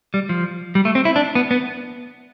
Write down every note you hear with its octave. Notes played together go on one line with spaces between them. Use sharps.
G3
F3
G3
A3
C4
E4
D4
B3
B3